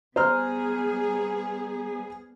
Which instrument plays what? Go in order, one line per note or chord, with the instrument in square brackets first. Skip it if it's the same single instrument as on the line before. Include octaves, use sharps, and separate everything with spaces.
[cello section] G3 B3 G#4 [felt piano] C5 A#5 F6